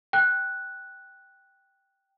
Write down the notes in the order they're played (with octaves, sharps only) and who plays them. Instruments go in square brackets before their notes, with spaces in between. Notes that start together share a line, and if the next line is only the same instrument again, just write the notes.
[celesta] G5 F#6